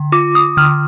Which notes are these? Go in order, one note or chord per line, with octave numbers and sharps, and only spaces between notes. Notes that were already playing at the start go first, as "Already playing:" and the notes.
Already playing: D3
F4 D6
D#6
D3 F6